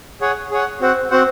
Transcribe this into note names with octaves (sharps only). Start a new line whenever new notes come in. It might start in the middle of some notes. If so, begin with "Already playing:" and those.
G#4 C#5 F#5
G#4 C#5 F#5
C4 F#4 C5 F#5
C4 F#4 C5 F#5